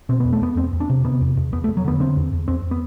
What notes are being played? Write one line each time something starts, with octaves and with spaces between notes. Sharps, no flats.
B2 C4
E2 B3
A3
E2 B3
E2 C4
E2
D4
C3
C3 B3
E2
E2
E2 B3
A3
E2
F#3
D3 B3
D3 C4
E2
E2
E2 C4
B3